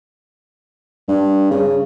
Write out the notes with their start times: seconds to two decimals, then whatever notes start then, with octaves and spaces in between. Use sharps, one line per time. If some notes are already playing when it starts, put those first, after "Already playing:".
1.08 G2
1.50 C#3